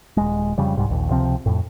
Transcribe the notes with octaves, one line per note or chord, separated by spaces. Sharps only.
D#1 G#3
F2 C#3 G3
C2 G#2 G3
A#1 D#2
C#2 C3 F3 C4
F2 A2